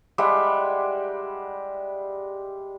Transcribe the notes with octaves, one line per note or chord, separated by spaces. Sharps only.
G3 G#3 E5 F#5